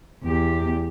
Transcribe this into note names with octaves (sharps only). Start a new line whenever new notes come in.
E2 G4